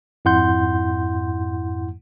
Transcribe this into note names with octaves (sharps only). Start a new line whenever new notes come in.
F2 G#2 E4 F#5 C6 G6